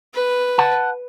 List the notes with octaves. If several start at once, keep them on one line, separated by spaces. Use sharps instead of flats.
B4
F#5 A5